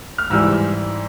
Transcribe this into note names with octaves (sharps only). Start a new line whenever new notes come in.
F6
G#2 E3 G3 E6